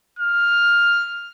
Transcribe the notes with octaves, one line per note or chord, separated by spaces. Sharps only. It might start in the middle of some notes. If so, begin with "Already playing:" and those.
F6